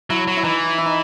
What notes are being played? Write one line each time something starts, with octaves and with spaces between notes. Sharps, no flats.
F#3 E4
F#3
E4
E3 D#4
E4
D#4